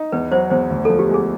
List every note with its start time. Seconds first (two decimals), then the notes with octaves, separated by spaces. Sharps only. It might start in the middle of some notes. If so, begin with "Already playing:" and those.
Already playing: D#4
0.12 E2 B4
0.31 F#3 C5
0.50 E2 C5
0.70 D2
0.85 F3 A4
0.99 G4
1.09 G#3 G#4